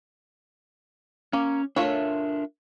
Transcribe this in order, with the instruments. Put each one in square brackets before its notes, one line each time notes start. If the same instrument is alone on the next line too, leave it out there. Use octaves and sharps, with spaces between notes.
[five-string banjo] A#3 [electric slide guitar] C#4
[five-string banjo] A3 F4 C#5 [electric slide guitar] D4 A#4 E5